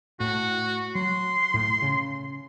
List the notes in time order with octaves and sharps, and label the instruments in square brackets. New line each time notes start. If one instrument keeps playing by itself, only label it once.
[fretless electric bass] A2 [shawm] F#4
[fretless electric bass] F#3 [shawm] C6
[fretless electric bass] A2
C#3